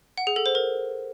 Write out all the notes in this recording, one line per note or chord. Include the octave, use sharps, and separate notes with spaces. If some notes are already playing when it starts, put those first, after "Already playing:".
F#5
G#4
A4
C5
A#4